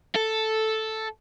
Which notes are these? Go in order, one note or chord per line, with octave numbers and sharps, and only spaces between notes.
A4